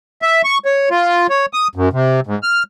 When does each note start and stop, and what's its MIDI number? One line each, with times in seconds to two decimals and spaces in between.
0.22 0.42 76
0.44 0.58 85
0.65 0.89 73
0.91 1.27 65
1.29 1.46 73
1.53 1.68 87
1.75 1.89 42
1.93 2.20 48
2.27 2.39 44
2.43 2.63 89